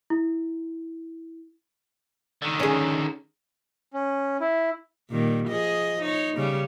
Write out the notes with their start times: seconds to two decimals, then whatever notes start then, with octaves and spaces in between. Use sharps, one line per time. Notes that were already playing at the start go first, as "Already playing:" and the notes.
0.10 E4
2.42 D3 D#3
2.60 C#4 G#4
3.93 C#4
4.40 E4
5.11 A#2 D#3 G3
5.49 F3 G#4 D#5
6.01 D#4 C#5
6.36 C#3 G3 C#4